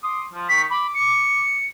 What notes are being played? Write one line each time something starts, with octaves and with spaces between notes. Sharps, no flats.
C6 D6 D#6
F3
D#3 C#6 B6
B5 D6
C#7